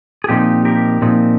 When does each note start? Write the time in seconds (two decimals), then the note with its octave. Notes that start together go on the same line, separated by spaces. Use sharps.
0.24 G#4
0.29 A#2 F3 C4 D#4 G4
0.65 G4 A#4
1.02 A#2 F3 C4 D#4